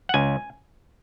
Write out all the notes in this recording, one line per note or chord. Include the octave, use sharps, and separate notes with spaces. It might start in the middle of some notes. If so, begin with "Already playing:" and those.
F#5
C#2 G#5